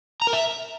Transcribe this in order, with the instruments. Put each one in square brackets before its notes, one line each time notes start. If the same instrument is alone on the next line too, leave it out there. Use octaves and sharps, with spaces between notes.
[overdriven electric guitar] A#5
A#4
E5